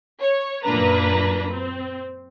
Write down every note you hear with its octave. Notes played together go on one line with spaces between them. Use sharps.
C#5
F#2 A#2 A#3 D4 B4 A#5
C4